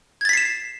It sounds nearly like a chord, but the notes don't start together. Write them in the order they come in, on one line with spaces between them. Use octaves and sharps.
G#6 A6 B6 C7 E7